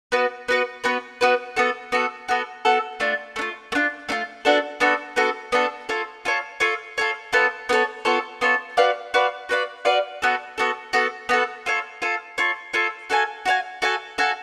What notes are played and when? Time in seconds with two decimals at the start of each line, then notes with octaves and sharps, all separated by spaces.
0.12 B3 F#4 B4
0.48 B3 F#4 B4
0.84 B3 F#4 B4
1.21 B3 F#4 B4
1.56 B3 F#4 A4
1.92 B3 F#4 A4
2.28 B3 F#4 A4
2.65 B3 F#4 A4
3.00 A3 D4 F4
3.36 A3 D4
3.41 F4
3.72 A3
3.75 D4 F4
4.09 A3 D4 F4
4.45 B3 D4 F#4 A4
4.80 B3 D4 F#4 A4
5.16 B3 D4 F#4 A4
5.52 B3 D4 F#4 A4
5.89 F4 A4 C#5
6.25 F4 A4 C#5
6.60 F4 A4 C#5
6.98 F4 A4 C#5
7.33 B3 F4 A4 C#5
7.69 B3 F4 A4 C#5
8.05 B3 F4 A4 C#5
8.41 B3 F4 A4 C#5
8.77 F#4 B4 D5 F5
9.14 F#4 B4 D5 F5
9.49 F#4 B4 D5 F5
9.85 F#4 B4 D5 F5
10.22 B3 F#4 A4
10.58 B3 F#4 A4
10.93 B3 F#4 A4
11.29 B3 F#4 A4
11.66 F4 A4 C#5
12.02 F4 A4 C#5
12.38 F4 A4 C#5
12.73 F4 A4 C#5
13.10 F#4 A4 F5 G#5
13.46 F#4 A4 F5 G#5
13.82 F#4 A4 F5 G#5
14.18 F#4 A4 F5 G#5